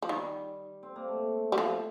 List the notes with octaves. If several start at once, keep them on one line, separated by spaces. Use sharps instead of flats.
F3
D#3 G3
C4
A#3
A3
G3
F3